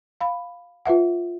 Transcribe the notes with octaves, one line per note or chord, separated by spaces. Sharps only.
F5 B5
F4 B4 E5 F#5